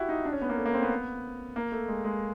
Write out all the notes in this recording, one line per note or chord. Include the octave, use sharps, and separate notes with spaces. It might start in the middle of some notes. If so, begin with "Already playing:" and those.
Already playing: E4 F#4 G4
D#4
D4
C#4
B3
A#3
A3
A#3
C4
B3
A#3
A3
G#3
G#3